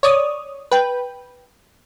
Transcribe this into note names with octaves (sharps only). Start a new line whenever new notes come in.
C#5 D5 D#6
B4 G5